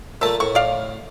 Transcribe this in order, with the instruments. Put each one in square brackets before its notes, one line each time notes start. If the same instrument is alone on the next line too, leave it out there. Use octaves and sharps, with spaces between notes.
[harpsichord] A#2 A3 [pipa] E5 A5
[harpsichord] A2 [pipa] C#6
[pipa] D5 F5